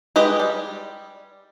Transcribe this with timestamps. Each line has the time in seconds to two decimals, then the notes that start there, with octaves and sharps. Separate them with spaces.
0.16 G#3 G4 B4 D#5
0.40 G3